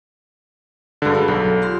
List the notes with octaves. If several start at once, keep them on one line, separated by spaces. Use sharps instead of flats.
G2 D3 G#3 F#4 G#4
B5
B1 F#3 A4
F4 G4 C6